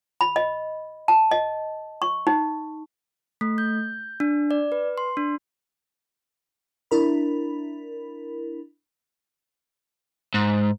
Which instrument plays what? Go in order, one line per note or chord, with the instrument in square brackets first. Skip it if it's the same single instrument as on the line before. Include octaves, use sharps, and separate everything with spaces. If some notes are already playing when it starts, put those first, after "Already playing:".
[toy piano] B5
D#5
A5
D#5
C#6
D#4
[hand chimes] A3
G6
D4
D5
B4
C6
D4
[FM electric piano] D4 E4 A#4 B5
[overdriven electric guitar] G#2